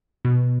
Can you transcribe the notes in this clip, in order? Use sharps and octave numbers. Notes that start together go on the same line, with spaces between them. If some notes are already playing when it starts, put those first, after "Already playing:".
B2